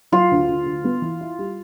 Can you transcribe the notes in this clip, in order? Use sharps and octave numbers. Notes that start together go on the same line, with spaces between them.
F#3 F4
D2
D2
D3
B3
E3
E4
G3